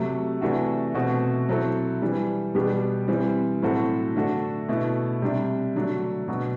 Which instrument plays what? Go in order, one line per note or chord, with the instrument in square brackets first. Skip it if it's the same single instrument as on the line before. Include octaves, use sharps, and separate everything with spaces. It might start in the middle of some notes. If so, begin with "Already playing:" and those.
Already playing: [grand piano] C3 F#3 A3
C3 E3 A3 D4 F#4
B2 A3 C4 F#4
F#3 C4 E4 A4
E3 G3 D4
B2 G3 B3 D4 G4
E3 G3 C4
A2 F#3 C4 F#4 A4
D3 A3 D4 F#4 A4
B2 A3 E4
C3 G3 D4
D3 F#3 A3 D4
B2 F#3 B3 F#4